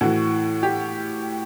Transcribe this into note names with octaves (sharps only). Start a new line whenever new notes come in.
A2 E3 F#4
G4